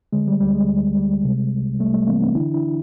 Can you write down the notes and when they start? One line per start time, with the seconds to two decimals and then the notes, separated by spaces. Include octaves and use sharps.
0.13 D3 G#3
0.28 G3
0.40 D2 G3
0.54 G#3
0.68 D2
0.97 G3
1.24 C3
1.52 C2
1.79 C2 G3 A3
1.94 G3 A3
2.07 E3 A#3 C4
2.22 B3 C#4
2.35 D3 D4 E4
2.54 D4 E4